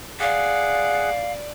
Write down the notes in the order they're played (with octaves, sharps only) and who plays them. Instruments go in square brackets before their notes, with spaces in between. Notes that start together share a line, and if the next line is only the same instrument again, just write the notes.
[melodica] G#4 F#5 [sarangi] D5 [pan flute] F5